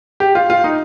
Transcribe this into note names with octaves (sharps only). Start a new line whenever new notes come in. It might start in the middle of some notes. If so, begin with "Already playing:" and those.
G4
F4
F4
D#4